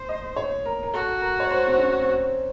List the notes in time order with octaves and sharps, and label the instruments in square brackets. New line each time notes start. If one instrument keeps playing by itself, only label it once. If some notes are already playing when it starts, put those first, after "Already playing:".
Already playing: [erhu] C5
[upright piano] D#5
C#5
A#4
A#4
[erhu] F#4 [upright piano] A4
[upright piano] A#4
C#5
C5
C4
C#4
C4